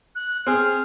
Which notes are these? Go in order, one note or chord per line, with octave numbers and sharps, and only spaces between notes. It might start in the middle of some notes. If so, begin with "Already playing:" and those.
F#6
C4 G#4 F6